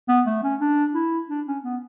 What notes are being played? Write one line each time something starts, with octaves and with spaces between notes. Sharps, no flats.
B3
A3
C#4
D4
E4
D4
C#4
B3